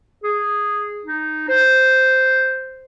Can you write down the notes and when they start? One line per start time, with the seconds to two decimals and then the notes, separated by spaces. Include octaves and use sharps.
0.24 G#4
1.05 D#4
1.48 C5